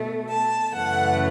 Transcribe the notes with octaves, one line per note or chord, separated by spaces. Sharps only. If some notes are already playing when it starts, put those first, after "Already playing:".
Already playing: B2 A3
A5
F#2 C#3 E3 A3 F#5